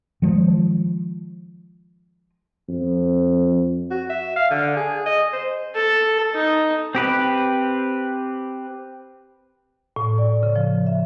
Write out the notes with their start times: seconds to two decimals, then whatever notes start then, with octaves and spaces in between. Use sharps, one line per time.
0.22 D#3 F3 G#3
2.69 F2
3.91 F#4
4.09 E5
4.36 F5
4.51 D3
4.76 G#4
5.06 D#5
5.33 C5
5.75 A4
6.35 D#4
6.95 C4 G4 B4
9.96 A2
10.18 D5
10.43 C#3
10.56 F3
10.87 E5